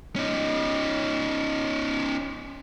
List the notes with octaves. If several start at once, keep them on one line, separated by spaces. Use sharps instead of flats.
C#4 D#4